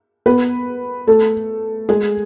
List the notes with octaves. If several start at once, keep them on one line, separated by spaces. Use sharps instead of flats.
B3 B4
A3 A4
G#3 G#4